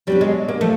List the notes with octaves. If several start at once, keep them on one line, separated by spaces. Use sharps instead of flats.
F#3 G3 B3 D4
G#3
A#3
F3 A3